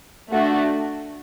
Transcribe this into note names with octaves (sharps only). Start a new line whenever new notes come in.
A3 D4 F#4